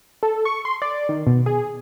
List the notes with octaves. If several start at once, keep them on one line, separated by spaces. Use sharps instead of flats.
A4
C#6
C6
D5
D#3
B2
G#4